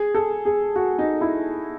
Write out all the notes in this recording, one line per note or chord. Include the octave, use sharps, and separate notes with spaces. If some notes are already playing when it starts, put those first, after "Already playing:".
Already playing: G#4
A4
G#4
F#4
D#4
E4